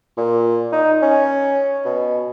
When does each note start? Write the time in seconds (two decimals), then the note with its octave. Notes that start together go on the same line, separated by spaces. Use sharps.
0.18 A#2
0.72 D#4
1.02 C#4
1.85 B2